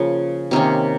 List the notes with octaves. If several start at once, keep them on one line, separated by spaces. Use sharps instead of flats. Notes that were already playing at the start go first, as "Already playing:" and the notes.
Already playing: C#3 F3 A#3
C3 D#3 A#3 C#4